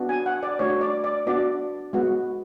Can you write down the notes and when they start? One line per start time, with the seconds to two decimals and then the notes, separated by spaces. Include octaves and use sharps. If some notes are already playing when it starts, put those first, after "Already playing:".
Already playing: B3 D4 F#4
0.09 G#5
0.26 F#5
0.43 D5
0.59 A3 D4 F#4 C#5
0.81 D5
1.04 D5
1.27 B3 D4 F#4 D5
1.93 G#3 B3 F#4